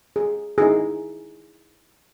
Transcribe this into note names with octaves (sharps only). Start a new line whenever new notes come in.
G#4
D#4 E4 G#4